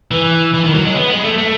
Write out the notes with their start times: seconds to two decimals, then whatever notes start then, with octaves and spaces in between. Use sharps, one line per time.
0.11 E3
0.54 E3
0.64 D#3
0.74 F#3
0.86 G#3
0.96 B3
1.10 G#3
1.25 A3
1.38 A3